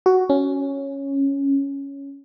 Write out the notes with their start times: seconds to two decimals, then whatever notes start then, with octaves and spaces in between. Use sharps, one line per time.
0.06 F#4
0.30 C#4